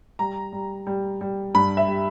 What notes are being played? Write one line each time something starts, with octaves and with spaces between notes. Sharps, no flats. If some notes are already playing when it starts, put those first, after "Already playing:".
G3 A#5
G3
G3
G3
G2 B5
E5
G3